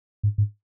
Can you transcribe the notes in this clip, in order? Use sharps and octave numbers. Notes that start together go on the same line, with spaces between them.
G#2
G#2